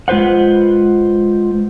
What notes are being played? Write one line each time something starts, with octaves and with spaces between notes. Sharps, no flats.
G#3 F4 B4 C5 F#5